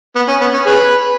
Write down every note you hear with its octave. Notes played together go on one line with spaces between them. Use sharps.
B3
C#4
B3
C#4
G#4 B4